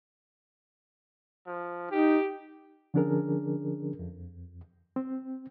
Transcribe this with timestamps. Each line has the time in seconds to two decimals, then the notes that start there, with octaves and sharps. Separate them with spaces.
1.47 F3
1.91 D#4 G4
2.94 D3 F3 C#4 D4 G#4 A#4
3.99 F2
4.96 C4